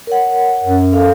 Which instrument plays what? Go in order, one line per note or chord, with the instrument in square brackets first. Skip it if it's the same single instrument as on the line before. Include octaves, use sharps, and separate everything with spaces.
[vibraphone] A#4 C#5 F#5
[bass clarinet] F#2
[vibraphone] A4 F5